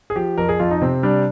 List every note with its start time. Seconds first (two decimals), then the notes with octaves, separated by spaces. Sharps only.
0.10 G#4
0.15 F3 G4
0.38 F2 A#4
0.49 G#4
0.59 F2 F4
0.71 D#4
0.82 C3 C4
1.03 G3 D4